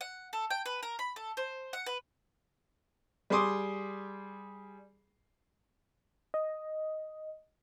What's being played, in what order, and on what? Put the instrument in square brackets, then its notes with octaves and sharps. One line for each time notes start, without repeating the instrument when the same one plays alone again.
[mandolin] F#5
A4
G5
B4
A#4
B5
A4
C5
F#5
B4
[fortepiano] G3 G#4 C6 D6 D#6
[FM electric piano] D#5